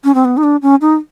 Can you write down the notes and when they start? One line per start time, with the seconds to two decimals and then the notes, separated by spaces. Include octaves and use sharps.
0.04 C#4
0.14 C4
0.25 B3
0.37 D#4
0.43 D4
0.62 C#4
0.81 D#4